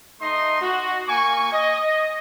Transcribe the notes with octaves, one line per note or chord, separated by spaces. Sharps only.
A3 D#4 D#5 C6
F#4
A#3 G#5 C#6
D#5